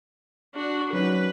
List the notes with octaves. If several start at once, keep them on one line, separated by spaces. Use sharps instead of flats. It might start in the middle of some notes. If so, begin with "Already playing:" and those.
D4 F#4
F#3 C#4 D#4 B4